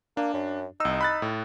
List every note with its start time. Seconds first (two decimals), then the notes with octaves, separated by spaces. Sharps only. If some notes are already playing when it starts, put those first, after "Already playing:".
0.17 A#3 D4
0.34 F#2
0.80 C2 D#4 E6
1.01 B5 F#6 A6
1.22 A2